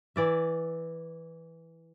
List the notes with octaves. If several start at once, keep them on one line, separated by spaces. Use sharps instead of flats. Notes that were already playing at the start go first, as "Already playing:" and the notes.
E3 D5 E5